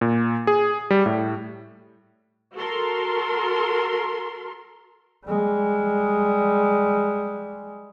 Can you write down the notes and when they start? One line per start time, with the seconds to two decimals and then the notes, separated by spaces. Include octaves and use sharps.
0.01 A#2
0.47 G#4
0.91 G3
1.06 A2
2.57 F#4 A4 A#4 C6
5.26 G3 G#3